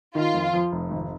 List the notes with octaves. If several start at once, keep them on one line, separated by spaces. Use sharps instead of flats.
D#3 F4
F2
F3
F1
G#1